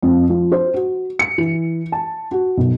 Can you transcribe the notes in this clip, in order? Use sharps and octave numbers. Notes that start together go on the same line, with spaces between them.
F2
F3
C5
F#4
C#7
E3
A5
F#4
B1